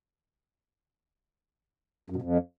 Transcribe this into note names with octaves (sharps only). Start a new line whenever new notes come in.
F#2
B2
F2